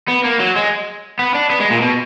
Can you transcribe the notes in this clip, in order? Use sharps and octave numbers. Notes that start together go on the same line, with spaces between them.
B3
A#3
F#3
G#3
B3
D4
B3
G#3
A#2
B2